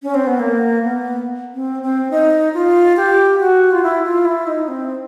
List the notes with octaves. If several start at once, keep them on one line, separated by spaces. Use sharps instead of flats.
C#4
C4
B3
A#3
B3
C4
C4
D#4
F4
G4
F#4
F4
E4
F4
E4
D#4
C4